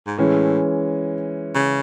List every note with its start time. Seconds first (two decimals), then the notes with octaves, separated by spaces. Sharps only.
0.07 G#2
0.18 A2 E3 G#3 C#4
1.55 C#3